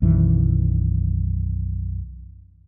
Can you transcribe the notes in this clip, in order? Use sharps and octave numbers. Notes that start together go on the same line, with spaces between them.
B1 F#2 D#3 E3